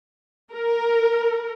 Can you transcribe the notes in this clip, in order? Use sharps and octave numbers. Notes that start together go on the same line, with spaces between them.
A#4